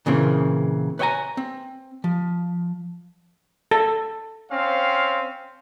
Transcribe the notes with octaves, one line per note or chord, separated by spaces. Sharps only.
A#2 C#3 E3 A#3 C4
B4 C#5 D#5 G5 G#5 A#5
C4
F3
A4
C4 C#4 F5